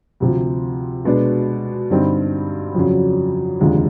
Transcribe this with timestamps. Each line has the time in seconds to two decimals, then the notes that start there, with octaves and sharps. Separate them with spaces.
0.20 D2 C3 F3
1.05 B2 G#3 B3 D4
1.90 G2 D3 G3 C4 D#4
2.75 F2 C#3 F#3
3.60 F1 D#2 D3 F3 G#3